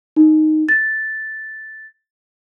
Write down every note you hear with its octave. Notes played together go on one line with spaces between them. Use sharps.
D#4
A6